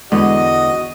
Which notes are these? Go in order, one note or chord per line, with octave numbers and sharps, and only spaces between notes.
E2 D3 G#3 F#4 D#5